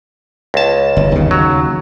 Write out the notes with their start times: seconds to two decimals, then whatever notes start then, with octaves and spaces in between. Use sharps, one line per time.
0.54 C#2 A5
0.97 G1
1.12 D#2 C#3
1.31 F#3